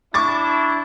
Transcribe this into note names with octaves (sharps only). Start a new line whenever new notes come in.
D4 E4 C#6 D6 A6